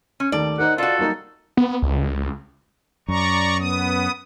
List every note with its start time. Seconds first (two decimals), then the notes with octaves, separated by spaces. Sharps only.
0.20 C#4
0.32 D#2 D#3 A3 D5
0.59 D#4 A#4 C5 D#5 F#5
0.78 F4 F#4 A4 D5
0.99 F#3 G3 A#3 D#4
1.57 B3
1.82 C#2
3.08 F#2 D5 A#5 C#6
3.59 B3 D#6